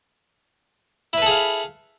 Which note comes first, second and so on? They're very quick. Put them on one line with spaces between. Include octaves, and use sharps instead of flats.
E4 B4 A4 G#4 F5